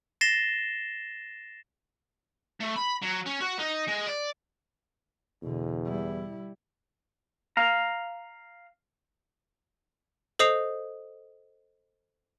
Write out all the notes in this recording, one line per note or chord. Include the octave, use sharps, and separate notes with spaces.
A6 A#6 C7 E7 G7
A3
B5
F#3
C#4
F#4
D#4
G#3
D5
E2 B2 D3
G3 E4
F5 A#5
A4 C5 D#5 D#6 C7 F7